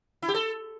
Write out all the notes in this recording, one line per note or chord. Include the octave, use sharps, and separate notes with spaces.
E4
G4
A4